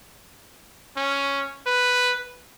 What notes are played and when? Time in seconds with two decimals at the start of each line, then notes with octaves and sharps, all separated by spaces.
0.97 C#4
1.66 B4